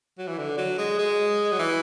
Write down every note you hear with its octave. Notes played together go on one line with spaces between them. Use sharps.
F#3
E3
D3
F#3
G#3
G#3
F#3
E3